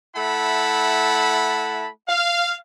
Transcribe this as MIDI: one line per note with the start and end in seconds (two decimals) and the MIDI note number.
0.16 1.88 57
0.16 1.88 64
0.16 1.88 78
0.16 1.88 81
0.16 1.88 83
2.08 2.55 77